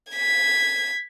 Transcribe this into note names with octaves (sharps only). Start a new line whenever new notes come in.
G#6 B6